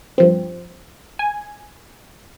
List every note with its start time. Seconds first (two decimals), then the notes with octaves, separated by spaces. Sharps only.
0.18 G2 F3 C4
1.19 G#5